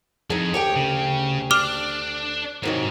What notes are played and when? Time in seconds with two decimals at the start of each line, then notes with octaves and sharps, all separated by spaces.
0.30 F2 D#4 G#4
0.54 D2 G4 C#5 G5
0.76 C#3
1.51 D4 D6 F6 F7
2.63 G#2 C3 D#3 F#3